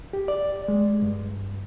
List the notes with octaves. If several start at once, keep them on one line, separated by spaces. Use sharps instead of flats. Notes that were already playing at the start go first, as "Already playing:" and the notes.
G4
D5
G#3
G2